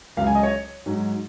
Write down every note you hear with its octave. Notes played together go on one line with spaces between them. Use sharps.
C#2 C#3 F#3 F5
G#5
D#5
C#5
G#2 F#3